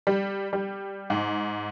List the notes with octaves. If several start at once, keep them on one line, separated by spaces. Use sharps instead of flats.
G3
G3
G#2